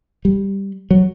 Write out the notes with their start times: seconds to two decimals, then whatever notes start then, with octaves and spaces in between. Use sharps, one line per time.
0.25 G3
0.91 F#3